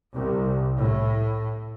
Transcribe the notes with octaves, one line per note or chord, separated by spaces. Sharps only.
C2
A2